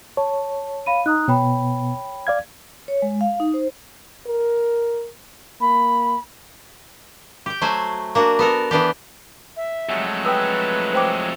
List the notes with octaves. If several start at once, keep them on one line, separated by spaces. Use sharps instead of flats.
C#5 A5
F5 B5 D#7
D#4 A#5 D#6 F#6
B2 B3 C#5 G5 B5
D5 F5 G#6
C#5
G#3
F5
D#4
C5
A#4
A#3 B5
G4 G5
F#3 A3 C5 E5 G#5
A#3 D4 F#4
B3 A4 A#4
E3 B3 D4 G4
E5
F2 F#3 G#3 A3
B4 G5 D#6 E6
C5 G5 D6